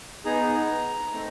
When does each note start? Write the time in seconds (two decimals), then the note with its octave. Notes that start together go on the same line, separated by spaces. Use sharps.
0.25 B3 D#4 G#4 A#5
1.13 A3 C4 D#4